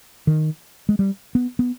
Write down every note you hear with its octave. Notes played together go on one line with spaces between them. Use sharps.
D#3
G#3
G3
B3
B3